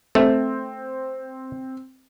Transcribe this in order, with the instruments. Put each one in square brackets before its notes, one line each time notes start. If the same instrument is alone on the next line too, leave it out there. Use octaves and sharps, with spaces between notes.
[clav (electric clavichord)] A3 [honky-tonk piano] C4